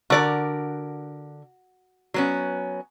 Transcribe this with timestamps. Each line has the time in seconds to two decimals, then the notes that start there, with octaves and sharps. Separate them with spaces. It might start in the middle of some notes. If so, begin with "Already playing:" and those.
0.10 D3 F#4 A#4 D5
2.14 F#3 B3 C#4